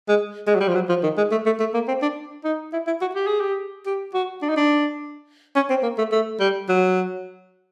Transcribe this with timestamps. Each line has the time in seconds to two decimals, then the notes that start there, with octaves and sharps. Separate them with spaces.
0.09 G#3
0.47 G#3
0.55 F#3
0.61 G3
0.69 F3
0.75 F#3
0.89 F3
1.03 D#3
1.17 G#3
1.31 A3
1.46 A3
1.60 A3
1.74 A#3
1.88 C4
2.02 D4
2.44 D#4
2.73 E4
2.87 E4
3.01 F#4
3.15 G4
3.27 G#4
3.40 G4
3.86 G4
4.14 F#4
4.42 D4
4.49 D#4
4.56 D4
5.56 C#4
5.70 C4
5.83 A#3
5.98 A3
6.12 A3
6.40 G3
6.69 F#3